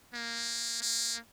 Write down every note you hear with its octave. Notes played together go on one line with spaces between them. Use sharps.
A#3
A#3